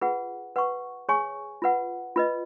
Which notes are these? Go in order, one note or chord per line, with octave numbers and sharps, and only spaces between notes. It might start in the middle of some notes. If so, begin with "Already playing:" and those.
F4 G#4 B4 F#5
B4 F#5 C#6
G#4 C#5 G#5 C#6
F4 B4 F#5
F4 B4 D#5